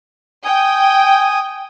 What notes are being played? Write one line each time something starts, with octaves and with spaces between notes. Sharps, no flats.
G5 G#5 D#6